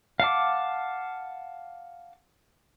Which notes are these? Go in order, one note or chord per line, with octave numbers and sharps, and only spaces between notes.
F5 F#5 A5 D6